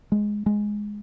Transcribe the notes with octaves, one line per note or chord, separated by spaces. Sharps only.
G#3
G#3